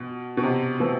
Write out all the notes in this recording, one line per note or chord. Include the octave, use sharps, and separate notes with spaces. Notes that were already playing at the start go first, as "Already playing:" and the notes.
Already playing: B2
B2
C3
E3 A3 C4